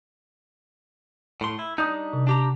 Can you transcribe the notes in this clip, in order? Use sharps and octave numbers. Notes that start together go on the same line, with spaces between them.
A2 C6
E4
G3 D4 D#4 D#6 G6
C3
D4 G4 A#5